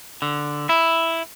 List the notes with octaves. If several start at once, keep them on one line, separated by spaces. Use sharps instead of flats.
D3
E4